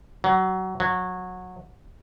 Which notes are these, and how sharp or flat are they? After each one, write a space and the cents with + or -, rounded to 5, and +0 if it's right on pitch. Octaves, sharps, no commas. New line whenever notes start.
F#3 +20
F#3 -20